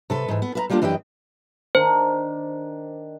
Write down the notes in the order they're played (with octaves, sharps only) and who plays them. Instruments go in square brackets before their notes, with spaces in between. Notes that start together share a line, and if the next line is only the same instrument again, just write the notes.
[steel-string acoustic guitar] C3 A4 B4
G#2 E3
B3
B4 E5 A#5
G3 A#3 D4 F4 A4
F#2 E3 D4 G4 D#5 G5
[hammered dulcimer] D#3 D4 A#5 [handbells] C5